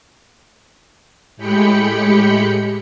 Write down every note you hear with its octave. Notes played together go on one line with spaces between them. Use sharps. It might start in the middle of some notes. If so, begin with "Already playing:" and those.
A2 G#3 G4 G5 B5 C#7